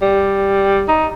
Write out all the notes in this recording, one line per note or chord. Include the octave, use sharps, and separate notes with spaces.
G3
D#4